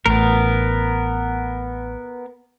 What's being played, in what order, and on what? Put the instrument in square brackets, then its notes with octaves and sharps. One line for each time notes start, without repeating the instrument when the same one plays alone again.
[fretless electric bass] A1 A2 [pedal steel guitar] B3 A#4